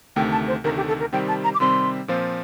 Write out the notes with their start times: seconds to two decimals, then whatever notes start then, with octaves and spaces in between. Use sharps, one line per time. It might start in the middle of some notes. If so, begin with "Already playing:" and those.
0.16 D2 C3 D#3 A3 G5
0.32 A5
0.48 C5
0.64 D2 C3 D#3 A3 A#4
0.76 G4
0.88 A4
1.00 A#4
1.12 C3 D#3 G3 C4 G5
1.28 A5
1.44 A#5
1.54 D6
1.60 C3 D#3 G3 C4 C6
2.08 A#2 F3 C4 F4 C5